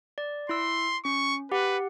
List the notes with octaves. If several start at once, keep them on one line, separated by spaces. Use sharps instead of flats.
D5
E4 C6 E6
C#4 C#6
G4 B4 F#5